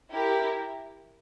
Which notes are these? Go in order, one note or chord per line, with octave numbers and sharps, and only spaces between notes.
E4 G4 A#4